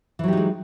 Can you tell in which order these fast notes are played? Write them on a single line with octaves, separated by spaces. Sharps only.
E3 F#3 G4 D#4 G#3